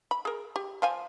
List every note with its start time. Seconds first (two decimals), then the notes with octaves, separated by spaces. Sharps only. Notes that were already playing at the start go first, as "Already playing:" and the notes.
0.11 B5
0.25 G#4 A#4
0.56 G4
0.82 F3 F5 G#5